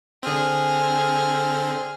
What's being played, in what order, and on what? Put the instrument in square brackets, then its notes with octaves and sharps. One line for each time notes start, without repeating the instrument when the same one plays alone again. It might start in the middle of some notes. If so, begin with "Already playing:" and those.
[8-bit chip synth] D3 C4 [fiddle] G#4 F6